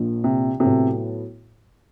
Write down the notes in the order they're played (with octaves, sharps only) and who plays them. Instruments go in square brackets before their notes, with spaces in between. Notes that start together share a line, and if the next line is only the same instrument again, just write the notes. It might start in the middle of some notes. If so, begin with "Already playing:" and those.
Already playing: [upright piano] A#1 A#2 F3
[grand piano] C3
[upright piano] A2 F#3 B3 E4 A4 [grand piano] C3